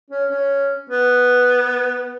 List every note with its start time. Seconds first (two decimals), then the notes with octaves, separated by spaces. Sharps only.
0.10 C#4
0.30 C#4
0.90 B3